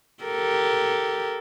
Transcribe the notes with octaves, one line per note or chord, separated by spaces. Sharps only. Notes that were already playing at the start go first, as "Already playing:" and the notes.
G4 A4 A#4